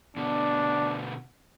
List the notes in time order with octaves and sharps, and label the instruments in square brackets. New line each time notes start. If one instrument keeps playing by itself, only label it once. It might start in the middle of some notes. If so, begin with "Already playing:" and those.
[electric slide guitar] B2 D3 B3 [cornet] D4